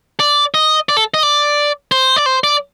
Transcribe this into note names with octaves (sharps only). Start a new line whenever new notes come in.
D5
D#5
D5
A4
D#5
D5
C5
D5
C5
D5